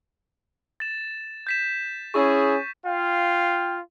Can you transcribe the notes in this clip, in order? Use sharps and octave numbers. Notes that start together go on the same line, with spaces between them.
A6 E7
G6 B6 E7
C#4 E4 G#4 C#6
F4 F5 G5